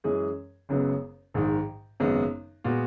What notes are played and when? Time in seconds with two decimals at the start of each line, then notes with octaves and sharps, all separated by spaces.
0.04 F#2 E3 G#3 C#4 G#4
0.69 F#1 F#2 C#3 G#3 B3
1.34 A#1 G#2 D#3
2.00 G#1 F#2 C#3 G#3 B3
2.64 A#2 G#3 B3 F#4